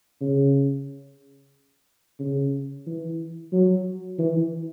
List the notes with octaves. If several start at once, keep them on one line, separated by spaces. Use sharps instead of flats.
C#3
C#3
E3
F#3
E3